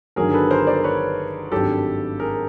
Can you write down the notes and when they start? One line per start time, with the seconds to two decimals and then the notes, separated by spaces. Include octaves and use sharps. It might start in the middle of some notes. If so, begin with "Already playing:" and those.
0.16 G1 G2 D#3 F#3 G#4 A#4
0.33 A4 B4
0.51 A#4 C5
0.67 C5 D5
0.84 B4 C#5
1.52 G#1 G2 D#3 F#3 G4 A4
2.20 G#4 A#4